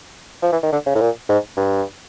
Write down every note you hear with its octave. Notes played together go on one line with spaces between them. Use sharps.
F3
E3
D#3
D3
C#3
A2
A#2
G#2
G2